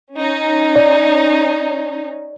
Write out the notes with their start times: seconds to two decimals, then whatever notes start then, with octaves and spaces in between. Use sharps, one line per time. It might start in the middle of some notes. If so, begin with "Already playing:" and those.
0.16 C#4 D#4
0.76 D5